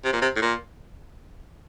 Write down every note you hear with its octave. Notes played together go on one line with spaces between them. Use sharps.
C3
A#2
C3
A2
A#2